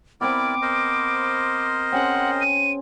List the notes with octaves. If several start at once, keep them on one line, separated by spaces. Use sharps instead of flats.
B3 C4 E4 A#4 D5 D6
A#4 C5 D#5
C4 C#4 G#4 F#5
D#7